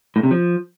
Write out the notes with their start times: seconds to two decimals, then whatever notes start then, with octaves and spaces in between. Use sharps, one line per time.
0.16 A2
0.23 C3
0.31 F3